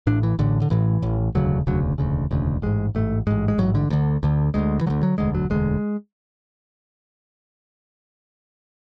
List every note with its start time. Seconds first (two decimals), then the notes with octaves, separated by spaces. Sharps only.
0.07 A1 A2 D4
0.23 E3
0.39 A1 A2 D3
0.62 D3
0.70 A1 A2 E3
1.02 A1 A2
1.35 E1 D2 C#3 F#3
1.67 E1 D2 C#3 F#3
1.98 E1 D2 C#3
2.31 E1 D2 C#3
2.62 A1 G#2 G#3
2.95 A1 G#2 A3
3.27 A1 G#2 G#3
3.48 G#3
3.58 A1 G#2 F#3
3.75 D3
3.90 D2 D3
4.23 D2 D3
4.54 D2 D3 G#3
4.81 E3
4.86 D3 F#3
4.90 D2
5.03 F#3
5.18 E1 D2 D3 G#3
5.35 F#3
5.50 E1 D2 D3 G#3